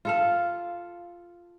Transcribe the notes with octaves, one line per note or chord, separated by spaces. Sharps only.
F4 A4 F5